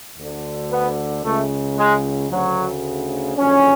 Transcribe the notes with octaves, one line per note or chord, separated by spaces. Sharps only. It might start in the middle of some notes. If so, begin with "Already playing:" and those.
D2 D3
B3
C#2 C#3 A3
G#3
D2 C#3 F#3
F#1 F2 D3 C#4